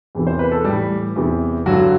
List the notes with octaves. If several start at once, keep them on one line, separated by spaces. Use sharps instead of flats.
E2 C3 E3
C5
B4
A4
A2 E3 G3 G4
E2 C3 E3
G2 D3 F#3 F#4